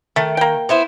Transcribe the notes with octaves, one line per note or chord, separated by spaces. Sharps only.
D#3 A3
A#3 G5
B3 E4 C5